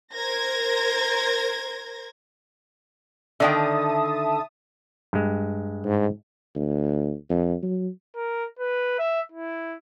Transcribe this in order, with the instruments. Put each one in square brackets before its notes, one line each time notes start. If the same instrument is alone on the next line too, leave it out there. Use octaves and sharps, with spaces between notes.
[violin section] A#4 C5 G#6 A#6
[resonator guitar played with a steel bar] D3 D#3 G5 [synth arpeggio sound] E5 A5 D#6
[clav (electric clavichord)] G2 G#3
[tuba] G#2
D2
F2
F#3
[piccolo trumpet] A#4
B4
E5
E4